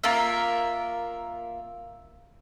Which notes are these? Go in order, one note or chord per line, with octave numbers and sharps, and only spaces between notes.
A#3 F4 A#4 E5